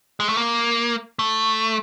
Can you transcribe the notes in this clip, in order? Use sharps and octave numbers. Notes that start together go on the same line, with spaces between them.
G#3
A3
A#3
A3